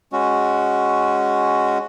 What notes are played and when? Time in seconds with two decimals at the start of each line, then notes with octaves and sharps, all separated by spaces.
0.13 G#3 C#4 F#4